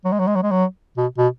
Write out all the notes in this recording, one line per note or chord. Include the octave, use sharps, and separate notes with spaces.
F#3
G#3
F#3
G#3
F#3
G#3
F#3
B2
B2